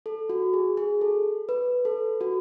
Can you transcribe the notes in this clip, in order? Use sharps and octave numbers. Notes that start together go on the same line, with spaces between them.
A4
F#4
G#4
G#4
A4
B4
A4
F#4